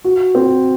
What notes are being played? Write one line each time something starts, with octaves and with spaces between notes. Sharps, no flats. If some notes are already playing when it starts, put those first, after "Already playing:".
F#4
C4